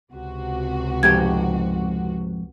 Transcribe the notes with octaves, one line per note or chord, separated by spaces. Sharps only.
C#2 C3 F#4
F2 G#2 G4 G#6